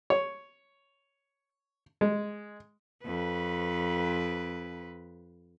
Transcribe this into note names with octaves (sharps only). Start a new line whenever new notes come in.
C#5
G#3
F2 B4